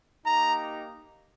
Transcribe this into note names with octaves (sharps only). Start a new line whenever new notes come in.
A#3 D#4 G4 A#5